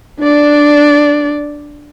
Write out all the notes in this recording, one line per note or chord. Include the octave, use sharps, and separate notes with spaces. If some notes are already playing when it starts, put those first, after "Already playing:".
D4 D5